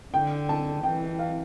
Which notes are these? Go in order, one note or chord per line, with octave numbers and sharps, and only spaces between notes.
D3 G5
A5
E3 G5
F5